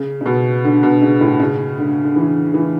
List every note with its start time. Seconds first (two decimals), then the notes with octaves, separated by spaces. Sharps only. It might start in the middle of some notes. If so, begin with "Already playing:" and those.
Already playing: C#3
0.21 C#3
0.26 B2
0.65 D3
0.83 B2
1.02 C#3
1.21 A2
1.40 C#3
1.79 D3
2.05 D3
2.16 E3
2.54 E3